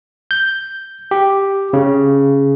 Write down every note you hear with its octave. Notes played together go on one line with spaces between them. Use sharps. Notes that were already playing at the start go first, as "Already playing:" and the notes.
G6
G4
C#3